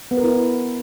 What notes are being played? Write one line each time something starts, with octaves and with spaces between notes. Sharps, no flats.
B3
A#4
E4